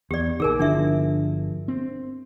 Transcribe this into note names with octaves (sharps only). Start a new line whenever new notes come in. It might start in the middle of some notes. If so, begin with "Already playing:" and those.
E2 G4 D5
A#1 D#3 G#4 A#4 G#5
G1 D3 F3 D4 E4 E5
C4